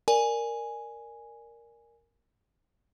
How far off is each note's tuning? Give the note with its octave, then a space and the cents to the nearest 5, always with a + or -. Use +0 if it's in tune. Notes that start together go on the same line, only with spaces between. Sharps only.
A#4 +0 D5 +0 G#5 +0